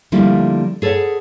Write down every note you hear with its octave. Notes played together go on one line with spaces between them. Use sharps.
D3 F3 G3 A3 A#3 E4
G#4 A4 B4 C#5 F#5